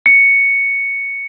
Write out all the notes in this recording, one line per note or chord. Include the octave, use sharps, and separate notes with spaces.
C#7